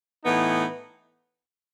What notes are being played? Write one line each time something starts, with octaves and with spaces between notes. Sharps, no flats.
A2 E3 B3 D#4